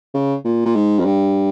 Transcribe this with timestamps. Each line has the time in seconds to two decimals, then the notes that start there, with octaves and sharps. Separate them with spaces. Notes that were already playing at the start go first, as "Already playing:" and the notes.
0.14 C#3
0.44 A#2
0.66 A#2
0.75 G#2
1.00 F2
1.05 G2